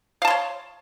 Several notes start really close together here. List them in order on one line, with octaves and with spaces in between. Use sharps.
F5 A5 C6 C#5